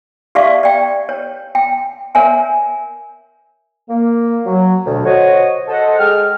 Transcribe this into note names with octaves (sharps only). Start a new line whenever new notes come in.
G4 D5 E5 F5 C#6
D5 G5
C#5
G5
A#4 C#5 E5 G#5
A#3
F#3
D2 B2
F#4 C5 C#5 D#5
A4 C5 D#5 F#5
G#3 G5 F6